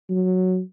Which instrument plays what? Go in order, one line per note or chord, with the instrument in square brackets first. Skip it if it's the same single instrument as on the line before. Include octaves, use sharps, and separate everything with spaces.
[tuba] F#3